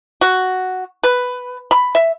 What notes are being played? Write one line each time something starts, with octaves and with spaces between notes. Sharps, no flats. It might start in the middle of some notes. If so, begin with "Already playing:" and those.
F#4
B4
B5
E5